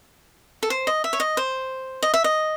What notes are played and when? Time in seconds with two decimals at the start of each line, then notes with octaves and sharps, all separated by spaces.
0.63 A4
0.70 C5
0.87 D#5
1.04 E5
1.13 C#5
1.20 D#5
1.37 C5
2.03 D#5
2.14 E5
2.24 D#5